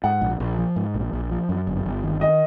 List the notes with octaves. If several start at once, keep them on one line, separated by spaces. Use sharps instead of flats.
G#2 F#5
A#1
A#1
F3
G#2
A#1
A#1
F3
F#2
G1
G1
D#3
D#5